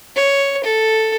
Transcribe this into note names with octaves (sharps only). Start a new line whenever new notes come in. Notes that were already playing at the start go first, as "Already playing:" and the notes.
C#5
A4